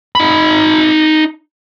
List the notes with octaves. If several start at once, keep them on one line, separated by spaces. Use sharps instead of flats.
D#4 B5